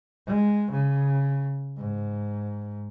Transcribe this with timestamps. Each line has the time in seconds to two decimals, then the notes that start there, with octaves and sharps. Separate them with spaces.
0.26 G#3
0.70 C#3
1.77 G#2